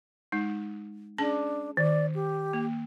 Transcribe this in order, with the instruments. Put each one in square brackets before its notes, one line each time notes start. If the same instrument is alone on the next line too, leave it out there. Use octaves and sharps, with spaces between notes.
[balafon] G#3 D#4
[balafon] C#4 G#4 A5 [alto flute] D4
[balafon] D#3 [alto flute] D5
[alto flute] G4
[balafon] A#3